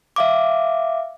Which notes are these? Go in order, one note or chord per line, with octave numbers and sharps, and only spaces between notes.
E5 F5 D6